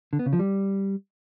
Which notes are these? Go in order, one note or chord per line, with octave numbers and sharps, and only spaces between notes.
D3
B3
C#3
F3
G3